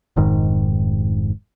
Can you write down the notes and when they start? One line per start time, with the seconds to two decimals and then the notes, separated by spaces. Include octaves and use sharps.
0.16 F1 G#2 D#3